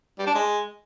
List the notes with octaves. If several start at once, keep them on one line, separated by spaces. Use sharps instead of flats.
G3
D4
G#3